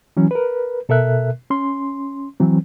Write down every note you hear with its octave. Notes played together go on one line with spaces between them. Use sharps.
E3 F#3 C#4
A#4 B4
B2 A4 A#4 E5 F#6
C#4 C6
E3 F#3 C4